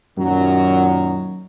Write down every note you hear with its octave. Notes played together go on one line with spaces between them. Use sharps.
F#2 A#2 D#3 F#3